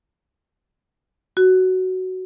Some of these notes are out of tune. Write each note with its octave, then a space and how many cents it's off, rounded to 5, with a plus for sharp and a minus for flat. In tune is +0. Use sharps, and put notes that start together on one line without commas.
F#4 +10